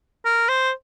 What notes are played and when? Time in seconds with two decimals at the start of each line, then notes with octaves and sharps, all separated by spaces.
0.25 A#4
0.49 C5